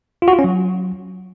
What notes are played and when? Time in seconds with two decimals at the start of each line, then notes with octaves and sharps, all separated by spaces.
0.22 F4
0.28 F#4
0.33 F4
0.39 C#4
0.44 F#3